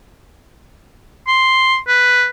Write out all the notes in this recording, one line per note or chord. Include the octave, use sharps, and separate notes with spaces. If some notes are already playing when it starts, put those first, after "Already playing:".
C6
B4